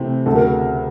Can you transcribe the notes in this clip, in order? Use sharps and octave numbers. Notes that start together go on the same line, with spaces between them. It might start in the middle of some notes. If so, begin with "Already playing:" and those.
Already playing: C3 E3 A3 C4
D2 C#3 F#3 A4
A#4